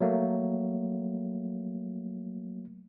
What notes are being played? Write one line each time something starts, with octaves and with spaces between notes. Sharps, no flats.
F#3 A3 A#3